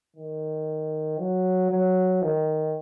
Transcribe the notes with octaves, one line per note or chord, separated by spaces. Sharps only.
D#3
F#3
F#3
D#3